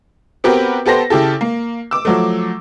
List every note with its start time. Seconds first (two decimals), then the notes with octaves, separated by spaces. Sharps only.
0.44 B3 C4 F#4 G4 A#4 B4
0.86 B3 G4 A4 C5 A#6
1.10 C#3 E4 G4 A4
1.41 A#3
1.91 D6 E6
2.05 F3 F#3 A3